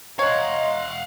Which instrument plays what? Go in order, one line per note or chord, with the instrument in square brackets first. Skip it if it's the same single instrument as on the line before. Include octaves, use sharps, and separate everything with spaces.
[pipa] C#5 [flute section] D#5 A#5 C6 [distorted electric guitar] F5 F#5